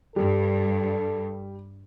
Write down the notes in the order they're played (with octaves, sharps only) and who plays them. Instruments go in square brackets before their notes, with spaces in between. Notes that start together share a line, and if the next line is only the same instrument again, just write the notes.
[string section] G2 [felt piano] G3 [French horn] A4